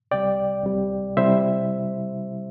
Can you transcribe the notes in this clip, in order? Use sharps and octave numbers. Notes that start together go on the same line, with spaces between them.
C2 C3 G3 D5 G5
C2 C3 G3
C3 G3 E4 C5 E5